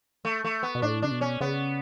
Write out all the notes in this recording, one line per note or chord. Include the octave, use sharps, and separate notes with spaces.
A3
A3
B3
B2
A2 D4
C#3 D4
B2
C#4
C#3 B3